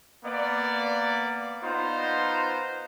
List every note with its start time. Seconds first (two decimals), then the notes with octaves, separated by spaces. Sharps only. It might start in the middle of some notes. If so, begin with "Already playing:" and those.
0.25 A#3 B3 D5
1.63 B3 D#4 F4 C5 A#5